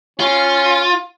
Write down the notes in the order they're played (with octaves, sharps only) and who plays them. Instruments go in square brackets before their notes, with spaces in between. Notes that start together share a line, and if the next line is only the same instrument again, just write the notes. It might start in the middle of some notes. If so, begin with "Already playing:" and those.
[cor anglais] C#4 [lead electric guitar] F4